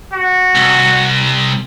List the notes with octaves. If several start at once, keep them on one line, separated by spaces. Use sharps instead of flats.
F#4
C2